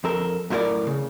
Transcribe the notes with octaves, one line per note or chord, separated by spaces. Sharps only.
F2 A4 A#4
F#2 A2 E4 F4 A#4 D5
C#3